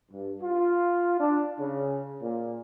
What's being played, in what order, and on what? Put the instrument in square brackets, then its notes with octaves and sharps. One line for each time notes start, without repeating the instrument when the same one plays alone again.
[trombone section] G2
F4
D4
C#3
A#2